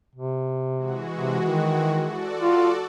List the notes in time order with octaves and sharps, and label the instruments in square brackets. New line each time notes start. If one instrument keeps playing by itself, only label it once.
[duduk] C3
[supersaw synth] E3 G#3 F#4
[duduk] C3
D#3
[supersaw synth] F#4 A4 D5
[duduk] F4